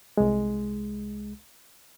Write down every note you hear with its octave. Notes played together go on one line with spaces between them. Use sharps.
C2 G#3